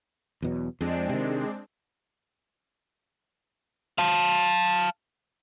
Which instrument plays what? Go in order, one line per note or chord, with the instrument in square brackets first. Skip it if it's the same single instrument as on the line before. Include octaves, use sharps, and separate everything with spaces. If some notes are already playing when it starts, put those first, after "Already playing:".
[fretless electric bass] E2 B2 F#3
[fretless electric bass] F2 [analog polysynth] G#3 C4 D4
[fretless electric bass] C3 D#3
[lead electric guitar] F5 A5